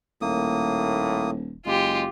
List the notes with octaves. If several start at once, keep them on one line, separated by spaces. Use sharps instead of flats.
D#1 A2 A#3 D#6
F#1 G#3 F4 G4